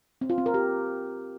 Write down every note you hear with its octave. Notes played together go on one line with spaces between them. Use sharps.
C4
F4
C4
A#4
G4